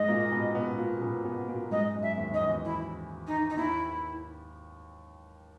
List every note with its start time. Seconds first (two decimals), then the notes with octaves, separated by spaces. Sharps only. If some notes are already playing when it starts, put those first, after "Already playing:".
Already playing: G#2 G#3 D#5
0.08 A#2 A#3
0.31 B2 B3
0.55 B2 B3
0.78 A#2 A#3
1.01 B2 B3
1.25 B2 B3
1.48 A#2 A#3
1.71 G#2 G#3 D#5
1.94 F#2 F#3
2.02 E5
2.18 D#2 D#3
2.30 D#3 D#5
2.41 E2 E3
2.64 E4
3.26 D#4
3.49 D#4
3.57 D#2 D#3 E4